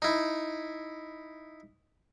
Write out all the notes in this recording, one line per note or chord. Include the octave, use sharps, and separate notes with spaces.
D#4 E4